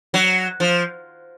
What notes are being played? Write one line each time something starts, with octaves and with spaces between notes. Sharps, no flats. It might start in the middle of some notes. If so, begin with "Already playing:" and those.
F#3
F3